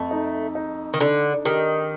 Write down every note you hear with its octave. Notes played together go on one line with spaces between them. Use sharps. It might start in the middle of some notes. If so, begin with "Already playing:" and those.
Already playing: F2 A3
D#4
D#4
D#3
D3 D4
D#3 G4